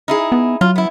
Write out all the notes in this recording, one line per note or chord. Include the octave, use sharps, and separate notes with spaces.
D#4 E4 G#4
B3
F#3 F4
B3 E4